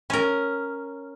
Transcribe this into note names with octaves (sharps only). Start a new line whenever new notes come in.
C#4 A#4